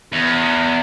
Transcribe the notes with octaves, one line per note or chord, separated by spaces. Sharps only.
E2